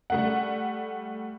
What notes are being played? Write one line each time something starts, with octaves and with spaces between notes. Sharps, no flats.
G3 A3 F#5